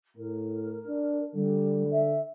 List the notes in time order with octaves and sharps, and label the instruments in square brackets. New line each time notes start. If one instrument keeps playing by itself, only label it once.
[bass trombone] A2 [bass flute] A#4
[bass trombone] D4
[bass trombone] D3 [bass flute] G3
[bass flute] E5